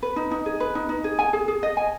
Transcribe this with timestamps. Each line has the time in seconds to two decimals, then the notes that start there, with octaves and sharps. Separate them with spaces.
0.03 B4
0.16 D#4
0.31 D#4
0.46 G#4
0.60 B4
0.75 D#4
0.89 D#4
1.04 G#4
1.19 G#5
1.33 G#4
1.48 G#4
1.63 D#5
1.77 G#5